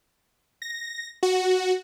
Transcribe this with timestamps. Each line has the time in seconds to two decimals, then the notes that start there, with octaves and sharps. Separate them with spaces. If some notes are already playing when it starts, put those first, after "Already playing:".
0.62 A#6
1.23 F#4